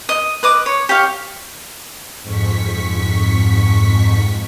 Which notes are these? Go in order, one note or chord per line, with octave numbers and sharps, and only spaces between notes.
D#5
B4 D#5 D6
C#5
G4 C#5 F5
F2 G#2 C#6 B6